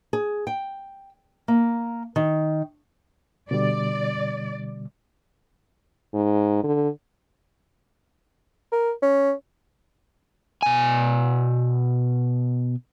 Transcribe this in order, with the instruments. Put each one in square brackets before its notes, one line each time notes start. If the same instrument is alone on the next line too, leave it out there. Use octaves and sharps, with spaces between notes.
[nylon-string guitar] G#4
G5
A#3
D#3
[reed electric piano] B2 D3 G3 [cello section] D5
[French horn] G#2
D3
[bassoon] A#4
C#4
[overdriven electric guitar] B2 G#5